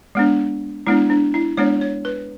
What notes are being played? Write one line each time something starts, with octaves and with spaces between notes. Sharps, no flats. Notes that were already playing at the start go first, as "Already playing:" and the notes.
G#3 B3 D4
G#3 B3 D4 E4
D4
E4
G#3 B3 D4 C#5
C#5
B4